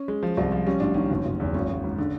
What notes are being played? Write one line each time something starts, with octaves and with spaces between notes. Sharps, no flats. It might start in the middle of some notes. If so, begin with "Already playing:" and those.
Already playing: C#4
G#3
F3
C2
F3
G3 C#4
A1 D4
D#3 C#4
F#1
F#1
E2
G#1 C#4
G#1
G#2
D3